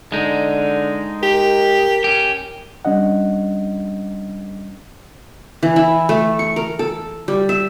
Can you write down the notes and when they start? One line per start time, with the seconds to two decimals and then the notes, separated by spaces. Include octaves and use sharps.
0.12 D3 G#3 D#4
1.23 G4 A#4
2.04 C#4 G4
2.85 G3 C#4 D4 D#5 F#5
5.63 E3
5.76 E4
6.09 A3
6.39 C#6
6.56 A#4
6.79 A4
7.28 G3
7.49 E5